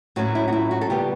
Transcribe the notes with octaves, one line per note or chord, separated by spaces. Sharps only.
A2 F#3 A3 C#4 F#4
E4
F#4
E4
F#4
A4
C#3 G3 B3 G4